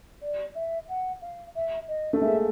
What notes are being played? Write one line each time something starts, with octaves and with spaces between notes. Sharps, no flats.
D5
E5
F#5
F5
E5
D#5
A3
G#3 A#3 E5